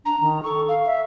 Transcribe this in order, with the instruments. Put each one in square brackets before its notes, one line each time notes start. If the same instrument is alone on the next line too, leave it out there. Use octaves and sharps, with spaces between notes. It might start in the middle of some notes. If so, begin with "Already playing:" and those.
[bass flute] D4 [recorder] A#5
[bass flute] D#3
[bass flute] A4 [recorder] C#6
[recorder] F5
[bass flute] E5